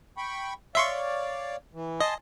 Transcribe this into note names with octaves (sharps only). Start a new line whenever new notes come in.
G5 B5 C#6
C#5 D5 E5 F5 C6 C#6
E3
D#5 G#5 A5 C6